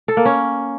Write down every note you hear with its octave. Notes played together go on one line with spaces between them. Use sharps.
A4
A#3
C#4